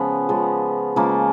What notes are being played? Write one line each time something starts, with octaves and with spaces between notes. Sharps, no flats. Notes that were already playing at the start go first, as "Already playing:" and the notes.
Already playing: C#3 F3 G#3 B3
C#3 F3 G#3
C#3 F3 G#3 A#3